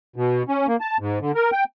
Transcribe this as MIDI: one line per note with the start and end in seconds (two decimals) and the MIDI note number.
0.16 0.43 47
0.48 0.67 61
0.67 0.77 58
0.81 0.97 81
1.00 1.19 44
1.20 1.32 50
1.35 1.51 70
1.52 1.64 79